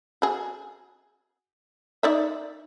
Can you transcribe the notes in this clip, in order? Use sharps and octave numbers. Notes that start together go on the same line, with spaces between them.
F#4 G#4
D#4 D5 E5